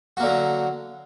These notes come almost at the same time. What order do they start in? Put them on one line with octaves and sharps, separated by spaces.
F#4 A#3 D3 F#3